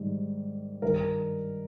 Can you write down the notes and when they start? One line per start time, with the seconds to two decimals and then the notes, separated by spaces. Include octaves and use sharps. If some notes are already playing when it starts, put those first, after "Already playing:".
Already playing: G#2 D#3 G3
0.82 G2 D#3 G3 A#4